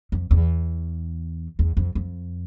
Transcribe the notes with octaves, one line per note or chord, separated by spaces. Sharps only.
F2
E2
E2
F2
F2